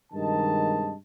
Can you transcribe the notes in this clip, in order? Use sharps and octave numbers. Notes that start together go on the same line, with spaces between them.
G2 C3 D#3 G#3 D#5 A5